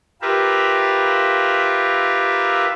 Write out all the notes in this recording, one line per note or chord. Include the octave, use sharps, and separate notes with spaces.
F4 G4 A#4 B4 E5